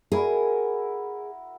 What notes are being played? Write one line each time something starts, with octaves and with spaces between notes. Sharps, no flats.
E4 F#4 G#4 A#4